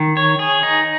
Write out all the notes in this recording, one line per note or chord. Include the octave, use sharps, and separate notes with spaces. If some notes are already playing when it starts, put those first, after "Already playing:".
Already playing: D#3
C#5
G#4
D#4